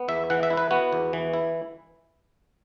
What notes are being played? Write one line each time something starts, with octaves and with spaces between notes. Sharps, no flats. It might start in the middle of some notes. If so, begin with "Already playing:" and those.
Already playing: B3
E2 E5
E3 F#5
E5
E4
B4
B3 F#4
E2
E3
E4